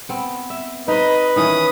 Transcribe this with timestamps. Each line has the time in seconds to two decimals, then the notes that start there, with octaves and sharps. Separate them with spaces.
0.09 B3 C4
0.50 E5
0.88 D#4 B4 C5 D#5
1.36 D#3 E3 C#4 D#6